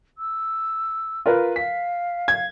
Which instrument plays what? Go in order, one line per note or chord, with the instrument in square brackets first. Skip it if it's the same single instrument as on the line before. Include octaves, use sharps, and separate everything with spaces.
[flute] E6
[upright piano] F4 A#4 B4
[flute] F5 [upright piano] B6
[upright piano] G#6